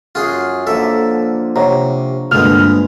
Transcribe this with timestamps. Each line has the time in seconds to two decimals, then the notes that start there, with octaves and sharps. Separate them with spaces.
0.15 F#2 F4 F#4 G#4
0.67 D3 F3 A#3 A4 E5
1.56 C3 C#5 F#5 A#5
2.31 D2 G2 A#2 G#3 B3 F6